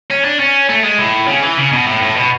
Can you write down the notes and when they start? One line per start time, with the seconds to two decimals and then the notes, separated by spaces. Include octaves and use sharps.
0.10 C#4
0.24 D4
0.39 C#4
0.69 A3
0.84 G#3
0.98 A2
1.27 C#3
1.42 E3
1.58 C#3
1.72 B2
1.87 A2
2.02 A2
2.16 B2